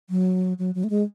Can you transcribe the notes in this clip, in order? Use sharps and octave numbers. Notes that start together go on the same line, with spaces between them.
F#3
F#3
F#3
A3
G#3